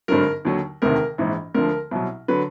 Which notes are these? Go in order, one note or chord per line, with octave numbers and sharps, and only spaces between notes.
G#1 G2 D3 F#3 A#4
D#2 D3 F#3
E1 D2 C3 D#3 A#4
A#1 G#2 E3
D2 D3 F3 A#4
C2 B2 F#3
D3 F#3 B4